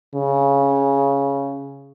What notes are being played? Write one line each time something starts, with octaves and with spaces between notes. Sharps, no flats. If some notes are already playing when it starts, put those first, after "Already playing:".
C#3